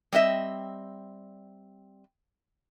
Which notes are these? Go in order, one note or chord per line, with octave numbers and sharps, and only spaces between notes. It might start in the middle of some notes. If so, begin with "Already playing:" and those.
G3 C4 D#5 E5